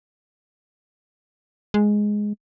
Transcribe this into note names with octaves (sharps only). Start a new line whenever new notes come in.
G#3